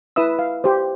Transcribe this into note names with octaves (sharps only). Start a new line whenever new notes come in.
E4 B4 E5 D#6 E6
F5
G4 C5